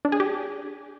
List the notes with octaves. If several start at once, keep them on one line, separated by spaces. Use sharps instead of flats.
D4
G#4
G4